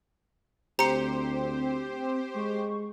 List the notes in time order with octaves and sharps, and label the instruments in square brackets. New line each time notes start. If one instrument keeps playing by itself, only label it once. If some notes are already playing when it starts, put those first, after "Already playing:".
[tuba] D2 [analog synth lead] C4 [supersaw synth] G4 C5 [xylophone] A#5 C#7
[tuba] G#3 [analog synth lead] C#6